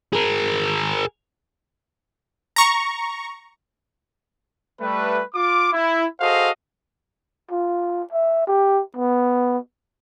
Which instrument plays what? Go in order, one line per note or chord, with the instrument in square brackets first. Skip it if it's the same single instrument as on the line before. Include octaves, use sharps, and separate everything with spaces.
[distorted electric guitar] G#4 A#4
[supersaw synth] A#5 C#6
[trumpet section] G3 A3 B4
F4 D6
E4
F#4 G#4 A4 C5 D#5 F5
[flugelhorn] F4
E5
G4
B3